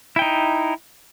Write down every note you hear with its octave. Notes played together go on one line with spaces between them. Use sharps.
D#4 E4 G5